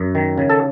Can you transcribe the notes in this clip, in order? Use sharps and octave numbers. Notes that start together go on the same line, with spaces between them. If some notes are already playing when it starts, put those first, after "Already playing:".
Already playing: F#2
D#3
C#3
A4